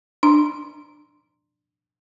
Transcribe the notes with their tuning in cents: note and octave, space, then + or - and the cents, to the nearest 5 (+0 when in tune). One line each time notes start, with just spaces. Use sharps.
D4 +15 A#5 +10